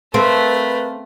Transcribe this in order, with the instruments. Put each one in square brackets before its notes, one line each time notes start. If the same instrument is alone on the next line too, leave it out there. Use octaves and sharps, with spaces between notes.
[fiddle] A3 [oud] C4 [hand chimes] A#4 F5 A5 [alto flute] B4